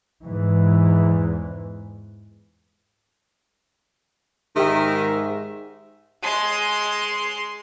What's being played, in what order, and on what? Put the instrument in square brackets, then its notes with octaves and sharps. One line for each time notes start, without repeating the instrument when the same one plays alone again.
[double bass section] E2 G#2 E3
[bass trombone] G#2 [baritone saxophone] D#3 [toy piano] G4 G5 [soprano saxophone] E5
[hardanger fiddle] G#3 C6